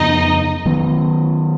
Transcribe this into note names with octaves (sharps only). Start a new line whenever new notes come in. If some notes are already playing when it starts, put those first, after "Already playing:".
Already playing: F2 C#3 F#3 B3 D#4 D#5
D#3 F#3 B3